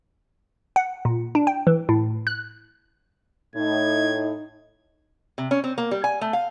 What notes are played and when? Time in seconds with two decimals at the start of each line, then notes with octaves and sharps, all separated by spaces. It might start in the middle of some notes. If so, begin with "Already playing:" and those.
0.76 F#5
1.05 A#2
1.35 D4
1.47 G5
1.67 E3
1.89 A2
2.27 F#6
3.55 A2 D#4 G#6
5.38 C3
5.51 C#4
5.64 C4
5.78 A#3
5.91 G3
6.04 G#5
6.21 A3
6.33 F5